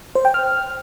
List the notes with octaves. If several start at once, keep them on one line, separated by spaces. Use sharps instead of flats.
C5
G5
F6